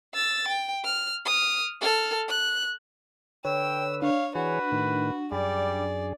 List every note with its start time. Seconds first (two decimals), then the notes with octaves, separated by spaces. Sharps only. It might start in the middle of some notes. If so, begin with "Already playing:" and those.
0.14 E6 A6
0.48 G5
0.84 F6
1.25 D#6 F6
1.81 A4 F6
2.28 F#6
3.45 D3 B4 C#5 G5 E6
4.02 D4 C#5 F5
4.35 E3 F#4 G#4 B4 C#5
4.72 A2 D#3
5.32 F#2 G3 G#4 D5